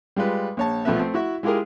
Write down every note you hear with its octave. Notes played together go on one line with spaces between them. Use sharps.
G3 G#3 F4 B4
A#1 C#5 A5
B1 F3 A3 B3 B4 E5
A3 C4
E4 F#4 E5
G#3 E4 F4 G4 G#4 A#4